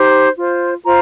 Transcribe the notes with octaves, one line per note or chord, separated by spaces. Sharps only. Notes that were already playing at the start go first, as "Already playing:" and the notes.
Already playing: D#4 G4 C5
F4 C5
F4 C5 A#5